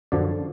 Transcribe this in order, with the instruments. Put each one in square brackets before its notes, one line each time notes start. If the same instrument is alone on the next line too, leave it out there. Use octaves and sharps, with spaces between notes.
[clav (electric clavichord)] F#2 D3 F3 D5